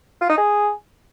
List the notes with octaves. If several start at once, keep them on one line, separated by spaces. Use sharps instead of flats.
F4
D#4
G#4